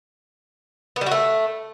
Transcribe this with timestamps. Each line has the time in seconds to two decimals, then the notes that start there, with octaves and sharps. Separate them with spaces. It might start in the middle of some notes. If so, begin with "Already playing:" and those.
0.96 B3
1.01 G3
1.06 F#4
1.11 A3